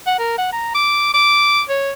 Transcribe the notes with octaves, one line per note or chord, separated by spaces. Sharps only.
F#5
A#4
F#5
A#5
D6
D6
C#5